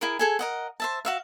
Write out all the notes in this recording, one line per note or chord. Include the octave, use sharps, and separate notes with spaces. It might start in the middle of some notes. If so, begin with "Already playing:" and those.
E4 G#4 A#4
G#4 A4 G#5
A#4 D#5 F#5
C5 E5 A5
F#4 E5 F5